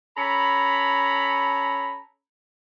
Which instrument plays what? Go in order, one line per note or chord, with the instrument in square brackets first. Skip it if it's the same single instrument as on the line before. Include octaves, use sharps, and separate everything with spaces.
[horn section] C#4 A4 A#5 B5